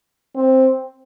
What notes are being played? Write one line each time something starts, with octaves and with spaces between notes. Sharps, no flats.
C4